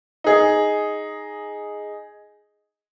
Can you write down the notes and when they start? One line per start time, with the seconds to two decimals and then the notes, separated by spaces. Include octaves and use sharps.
0.24 D#4 G#4